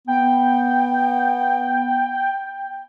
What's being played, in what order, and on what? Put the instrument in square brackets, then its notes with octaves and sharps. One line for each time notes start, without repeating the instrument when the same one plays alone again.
[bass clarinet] B3 [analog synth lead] G5